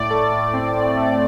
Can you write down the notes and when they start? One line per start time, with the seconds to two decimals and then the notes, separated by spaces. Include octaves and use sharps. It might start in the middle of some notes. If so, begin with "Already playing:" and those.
Already playing: A2 D5
0.10 A3
0.32 A2
0.54 C4
0.75 A2
0.97 A3